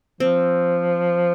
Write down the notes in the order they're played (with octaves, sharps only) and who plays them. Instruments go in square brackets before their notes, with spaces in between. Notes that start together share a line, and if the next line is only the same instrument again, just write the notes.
[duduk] F3 [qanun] C4